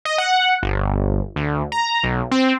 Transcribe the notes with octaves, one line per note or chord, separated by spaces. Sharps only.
D#5
F#5
G1
D2
A#5
B1
C4